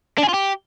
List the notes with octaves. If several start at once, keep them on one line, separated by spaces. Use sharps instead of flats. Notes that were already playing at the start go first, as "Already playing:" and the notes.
D4
G#4
F4
G4